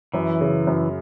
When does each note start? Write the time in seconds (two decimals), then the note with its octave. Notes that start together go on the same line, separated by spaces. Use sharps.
0.14 F#2 E3
0.41 C#3
0.67 F#2